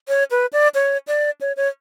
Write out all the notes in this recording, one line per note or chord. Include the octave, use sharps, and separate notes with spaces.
C#5
B4
D5
C#5
D5
C#5
C#5